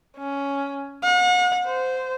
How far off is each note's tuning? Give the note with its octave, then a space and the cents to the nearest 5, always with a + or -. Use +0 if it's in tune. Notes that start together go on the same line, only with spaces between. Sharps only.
C#4 +10
F#5 -40
C5 -15